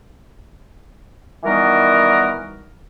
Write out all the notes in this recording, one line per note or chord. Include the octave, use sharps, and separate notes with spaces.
D#3 E3 G3 B3 F#4 A#4